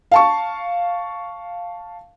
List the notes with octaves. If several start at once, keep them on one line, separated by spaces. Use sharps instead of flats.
F5 A5 C#6